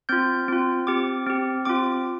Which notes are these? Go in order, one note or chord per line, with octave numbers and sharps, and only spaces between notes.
C4 F4 G6
C4 F4
C4 G4 D6
C4 G4
C4 F4 D6